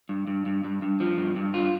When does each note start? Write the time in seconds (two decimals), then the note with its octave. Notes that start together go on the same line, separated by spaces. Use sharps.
0.09 G2
0.27 G2
0.46 G2
0.64 G2
0.82 G2
1.00 F3
1.18 G2
1.36 G2
1.54 F4